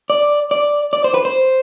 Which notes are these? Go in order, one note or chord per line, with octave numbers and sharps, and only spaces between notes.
D5
D5
D5
C5
B4
C5